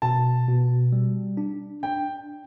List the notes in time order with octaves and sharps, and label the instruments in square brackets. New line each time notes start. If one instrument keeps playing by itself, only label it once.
[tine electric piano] B2 [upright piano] A5
[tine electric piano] B2
G3
D4
[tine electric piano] D4 [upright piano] G5